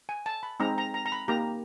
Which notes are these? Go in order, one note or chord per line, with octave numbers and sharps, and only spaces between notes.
G#5
A5
B5
G#3 C4 D#4 A#5
A#5
A#5
A#5
B5
A#3 D#4 G4 A#5